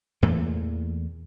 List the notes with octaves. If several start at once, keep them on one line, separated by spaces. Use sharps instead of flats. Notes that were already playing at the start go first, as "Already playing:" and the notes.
E2 A#2 E3 A3